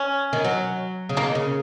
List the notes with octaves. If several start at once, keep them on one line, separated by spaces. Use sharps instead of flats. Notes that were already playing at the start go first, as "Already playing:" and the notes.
Already playing: C#4
D#3
F#3
C#3
D#3 A#3
C#3